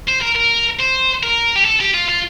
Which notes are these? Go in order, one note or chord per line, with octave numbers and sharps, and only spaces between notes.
C5
A#4
A#4
C5
A#4
G4
A4
G4
F4
F4